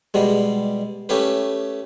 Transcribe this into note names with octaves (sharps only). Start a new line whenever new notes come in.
B2 G3 G#3
A3 C#4 G4 B4